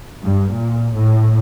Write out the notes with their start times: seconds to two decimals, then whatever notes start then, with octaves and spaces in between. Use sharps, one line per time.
0.23 G2
0.53 A#2
0.96 A2